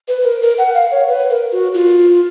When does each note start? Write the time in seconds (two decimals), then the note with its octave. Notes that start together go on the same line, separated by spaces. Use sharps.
0.08 B4
0.21 B4
0.25 A#4
0.42 A#4
0.59 F#5
0.74 F5
0.91 C#5
1.08 B4
1.30 A#4
1.52 F#4
1.74 F4